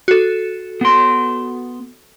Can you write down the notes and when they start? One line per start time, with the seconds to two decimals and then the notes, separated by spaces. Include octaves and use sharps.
0.08 F#4 A4
0.81 B3 C6